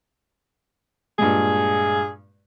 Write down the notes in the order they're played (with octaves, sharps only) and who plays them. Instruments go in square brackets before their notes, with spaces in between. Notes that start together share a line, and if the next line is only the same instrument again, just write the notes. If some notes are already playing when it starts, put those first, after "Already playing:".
[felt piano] G2 A#2 G#3 [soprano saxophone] G#4